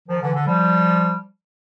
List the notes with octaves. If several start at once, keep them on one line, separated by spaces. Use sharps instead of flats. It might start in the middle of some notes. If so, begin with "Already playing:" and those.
D#3 F3
D3 E3
D3
F3 G3